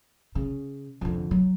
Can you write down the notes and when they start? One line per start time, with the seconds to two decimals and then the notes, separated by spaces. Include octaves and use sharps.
0.35 C#3
1.01 F2 D3
1.31 F#3